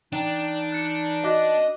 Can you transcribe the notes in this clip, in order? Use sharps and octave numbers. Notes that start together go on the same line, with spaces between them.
E3 D4 D#4 G5
F#6 C#7
F#4 D#5 D6 F#6